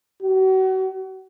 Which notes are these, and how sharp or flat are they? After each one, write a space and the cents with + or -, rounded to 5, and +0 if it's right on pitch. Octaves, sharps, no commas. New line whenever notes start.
F#4 +35